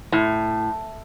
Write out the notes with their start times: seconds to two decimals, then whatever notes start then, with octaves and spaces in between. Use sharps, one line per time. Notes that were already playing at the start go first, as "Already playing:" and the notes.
0.12 A2